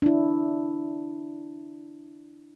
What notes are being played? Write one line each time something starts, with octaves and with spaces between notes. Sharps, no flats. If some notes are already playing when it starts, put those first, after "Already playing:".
D4 E4